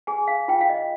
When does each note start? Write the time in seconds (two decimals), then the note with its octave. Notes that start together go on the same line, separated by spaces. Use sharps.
0.07 G#4 G#5
0.28 F5
0.48 F4 G5
0.61 F5
0.69 D#5